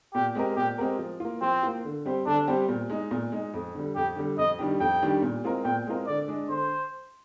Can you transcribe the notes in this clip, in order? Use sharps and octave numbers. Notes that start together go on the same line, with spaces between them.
A#2 G4
G#3 C4 G4 A#4
A#2 G4
G#3 C4 G4 A#4
F3
A#3 F4
F3 C4
A#3 F4
D3
G3 C4 G4 C5
D3 D4
G3 C4 G4 C5
A#2
G#3 D#4
A#2
G#3 D#4
F2
D3 G3
F2 G4
D3 G3
F2 D#5
D#3 G3 D4 G4
F2 G5
D#3 G3 D4 G4
A#2
G#3 C4 F4 A#4
A#2 G5
G#3 C4 F4 A#4
D3 D5
G#3 D4
D3 C5